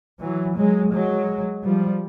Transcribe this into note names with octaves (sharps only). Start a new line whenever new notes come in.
E3 F#3
F#3 G#3
F#3 G#3
F3 G3